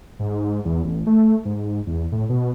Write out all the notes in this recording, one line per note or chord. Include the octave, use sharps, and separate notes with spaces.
G#2
E2
A1
A3
G#2
E2
A2
B2